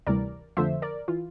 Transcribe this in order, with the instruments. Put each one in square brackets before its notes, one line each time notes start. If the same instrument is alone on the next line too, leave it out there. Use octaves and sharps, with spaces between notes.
[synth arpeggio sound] D2 C3 E3 G3 A#4 D5
F2 D3 F3 A3 C5 E5
A#4 D5
E3 F4